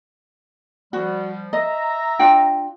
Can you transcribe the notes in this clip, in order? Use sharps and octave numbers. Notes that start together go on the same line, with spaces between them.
F3 G3 F#4
D#5 E5 A#5
D4 F4 G5